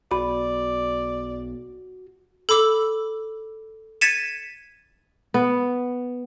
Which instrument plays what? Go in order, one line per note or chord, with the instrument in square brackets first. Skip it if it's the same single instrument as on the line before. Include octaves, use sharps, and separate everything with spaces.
[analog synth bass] B1 [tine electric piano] F#4 [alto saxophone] D5 [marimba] B5
[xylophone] A4 B5 D6 E6
G#6 A6 B6 C#7 D#7 E7
[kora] B3